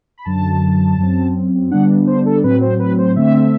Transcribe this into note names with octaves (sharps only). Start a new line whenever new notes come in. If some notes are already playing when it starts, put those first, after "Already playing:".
B5
F#2 D3 F#3 A5
F#2 F#3 C4
D3 G3 B3 D4 F#5
C5
A4
A2 F#3 C4 B4
C5
B4
C5
D3 A3 C4 E5